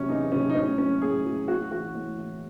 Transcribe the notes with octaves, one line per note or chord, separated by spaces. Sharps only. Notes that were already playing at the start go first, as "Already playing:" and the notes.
Already playing: C3 F#3 C#4
E2 D#4
C3 F#3 C#4
D#4
A2 C#4
F#3 C#4
A2 G#4
F#3
A2 F#4
E3 F#4
A2
E3